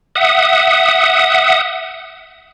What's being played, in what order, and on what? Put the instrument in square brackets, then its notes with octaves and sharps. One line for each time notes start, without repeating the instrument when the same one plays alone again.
[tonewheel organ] E5 F#5 D#6